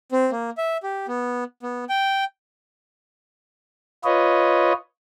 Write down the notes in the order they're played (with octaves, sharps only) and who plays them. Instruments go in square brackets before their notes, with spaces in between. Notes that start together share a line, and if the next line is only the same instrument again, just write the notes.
[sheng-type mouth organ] C4
A#3
E5
G4
B3
B3
G5
[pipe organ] F4 B4 C#5 D#5